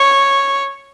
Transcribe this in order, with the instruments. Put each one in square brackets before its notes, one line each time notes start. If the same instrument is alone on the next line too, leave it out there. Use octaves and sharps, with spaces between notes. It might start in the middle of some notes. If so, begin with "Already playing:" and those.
Already playing: [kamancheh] C#5